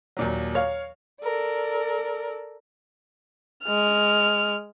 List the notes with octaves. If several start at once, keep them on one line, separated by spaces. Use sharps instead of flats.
D#2 A#2 F#3
C#5 F5
A4 A#4 D5
G#3 F6